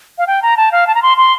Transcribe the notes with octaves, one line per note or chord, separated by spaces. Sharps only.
F5
G5
A#5
A5
F5
A5
A#5
C6
C6